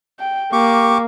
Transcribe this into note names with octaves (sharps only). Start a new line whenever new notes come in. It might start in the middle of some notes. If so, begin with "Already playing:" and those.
G5
A#3 G4 C#6 D6